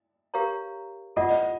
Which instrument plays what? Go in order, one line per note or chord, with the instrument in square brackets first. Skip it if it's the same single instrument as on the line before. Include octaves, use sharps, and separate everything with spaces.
[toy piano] G4 A#4 C#5 F5 A#5
[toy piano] F4 A4 D5 F#5 [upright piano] D#5